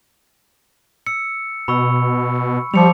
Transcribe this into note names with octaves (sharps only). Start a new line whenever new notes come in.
E6 C#7
B2 B5 C#6 E6
F3 G3 D6 C#7 F7